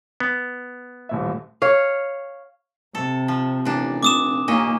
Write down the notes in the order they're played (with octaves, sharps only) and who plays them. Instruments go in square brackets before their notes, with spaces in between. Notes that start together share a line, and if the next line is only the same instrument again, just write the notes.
[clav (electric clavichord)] B3
[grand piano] D#1 A2 E5
[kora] C#5 F5
[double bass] C3 [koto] A4
[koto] F3
[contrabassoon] A1 [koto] A#2 D4
[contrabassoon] F1 [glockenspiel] D6 D#6 E7
[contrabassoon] D#2 [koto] A#2 C#4 D#5 [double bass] A#3